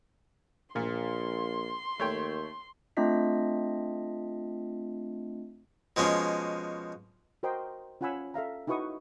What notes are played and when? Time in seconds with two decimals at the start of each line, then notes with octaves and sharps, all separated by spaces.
0.76 A#1 A#2 C6
2.00 D#2 A3 C#5 G5
2.97 A3 C4 D4 F4 D#5 B6
5.96 B2 F3 G#3 C#4
7.43 F#4 A#4 C5 D#5 G5 C6
8.01 C#4 F4 F#5 G#5 B5 E6
8.34 A4 E5 F5 A#5
8.67 D#4 E4 F#4 B4 C#6 D#6